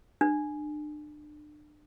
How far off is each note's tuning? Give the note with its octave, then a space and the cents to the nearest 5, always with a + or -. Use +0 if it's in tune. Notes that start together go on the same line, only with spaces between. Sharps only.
D4 +35